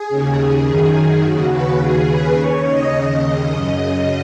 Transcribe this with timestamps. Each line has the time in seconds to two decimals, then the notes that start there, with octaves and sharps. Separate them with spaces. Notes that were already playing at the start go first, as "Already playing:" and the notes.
Already playing: G#4
0.09 D#2 C#3
0.38 G#4
0.67 F#2 D#3
1.23 D#2 C#3 F#4
1.52 B4
1.80 D#2 C#3 G#4
2.09 B4
2.38 D#2 C#3 C#5
2.66 D#5
2.95 D#2 C#3
3.52 F#2 C#3 D#5